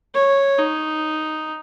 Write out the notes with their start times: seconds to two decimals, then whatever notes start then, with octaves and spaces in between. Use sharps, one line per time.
0.15 C#5
0.58 D#4